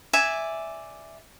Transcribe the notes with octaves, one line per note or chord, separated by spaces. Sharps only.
D5 E5 G#5